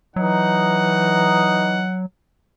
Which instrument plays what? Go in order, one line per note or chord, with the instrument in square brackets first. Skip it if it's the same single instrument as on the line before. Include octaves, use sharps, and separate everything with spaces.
[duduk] E3 [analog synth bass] F#3 [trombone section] D#4 [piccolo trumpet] F#5